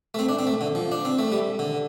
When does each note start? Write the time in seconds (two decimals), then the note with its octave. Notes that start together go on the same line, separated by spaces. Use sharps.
0.14 A3
0.19 C4
0.29 D4
0.39 C4
0.47 A3
0.61 D3
0.75 F3
0.92 D4
1.05 C4
1.19 A3
1.32 G3
1.59 D3